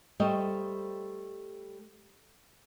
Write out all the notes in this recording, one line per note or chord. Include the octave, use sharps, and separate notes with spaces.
G3 A3 A4 C5 C#5 D#5